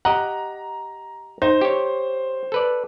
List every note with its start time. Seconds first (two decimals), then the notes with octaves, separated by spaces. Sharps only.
0.05 G4 D#5 F#5 A#5
1.42 D#4 C5
1.61 G4 C#5
2.52 A4 B4 D5